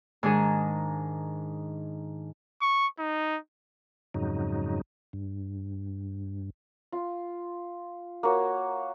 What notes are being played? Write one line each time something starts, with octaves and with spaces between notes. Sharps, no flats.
G#2 D#3 D4 G#4
C#6
D#4
F2 G#2 C#3 F#3 D#4
G2
F4
A#3 F#4 C#5